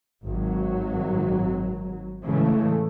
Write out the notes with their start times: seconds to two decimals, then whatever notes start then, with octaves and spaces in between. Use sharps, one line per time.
0.25 G#1 F#3
2.25 A2 C#3 E3 G#3 A3